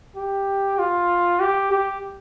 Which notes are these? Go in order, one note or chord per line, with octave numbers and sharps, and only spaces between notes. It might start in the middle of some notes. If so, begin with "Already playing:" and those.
G4
F4
G4
G4